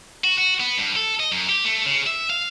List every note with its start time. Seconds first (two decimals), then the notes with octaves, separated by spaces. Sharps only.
0.24 F#4
0.38 F#4
0.60 B3
0.78 G2
0.96 A4
1.20 D#5
1.32 F#2
1.49 G4
1.65 A3
1.86 C#3
2.06 E5
2.30 F5